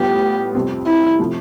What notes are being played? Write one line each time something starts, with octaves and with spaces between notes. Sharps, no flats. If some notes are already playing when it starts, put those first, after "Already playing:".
Already playing: A2 G3 B3 F4 G4
F2 C3 G3 C4
E4
C3 F3 A3